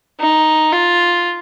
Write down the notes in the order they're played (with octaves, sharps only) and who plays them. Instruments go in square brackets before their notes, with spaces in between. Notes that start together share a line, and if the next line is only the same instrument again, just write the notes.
[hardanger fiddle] D#4
F4